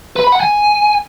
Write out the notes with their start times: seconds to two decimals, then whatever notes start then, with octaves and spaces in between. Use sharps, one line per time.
0.16 B4
0.24 B5
0.32 F#5
0.40 G#5